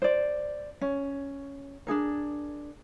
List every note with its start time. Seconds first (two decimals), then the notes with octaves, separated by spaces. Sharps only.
0.02 C5 D5
0.81 C#4
1.87 D4 D#4 G#4 A#4